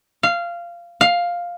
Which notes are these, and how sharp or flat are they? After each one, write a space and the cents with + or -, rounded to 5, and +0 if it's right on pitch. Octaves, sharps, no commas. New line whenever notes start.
F5 -15
F5 +5